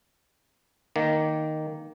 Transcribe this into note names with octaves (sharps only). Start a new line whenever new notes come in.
D#3 A#3